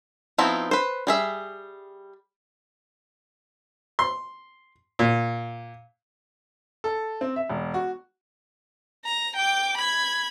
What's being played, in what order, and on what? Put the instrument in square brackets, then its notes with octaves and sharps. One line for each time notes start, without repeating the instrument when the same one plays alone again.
[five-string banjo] F3 B3 C4 D#4 E4
B4 C5
G3 G#4 E5
[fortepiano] C6
A#2
[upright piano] A4
C4
E5
E1
F#4
[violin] A#5
G5 D6
B5 G#6